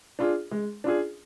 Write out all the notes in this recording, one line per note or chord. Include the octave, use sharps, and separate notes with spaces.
D4 F4 G#4
G#3
D4 F4 G#4